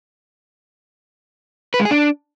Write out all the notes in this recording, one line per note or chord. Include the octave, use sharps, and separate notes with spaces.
B4
G#3
G#4
D4